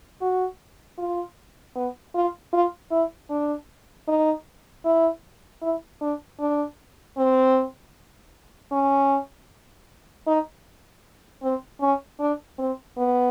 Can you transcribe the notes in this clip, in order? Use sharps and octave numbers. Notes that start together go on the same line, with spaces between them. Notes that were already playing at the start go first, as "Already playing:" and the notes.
F#4
F4
B3
F4
F4
E4
D4
D#4
E4
E4
D4
D4
C4
C#4
D#4
C4
C#4
D4
C4
B3